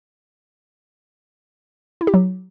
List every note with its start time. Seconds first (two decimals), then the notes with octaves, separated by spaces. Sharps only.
2.01 E4
2.07 G4
2.14 F#3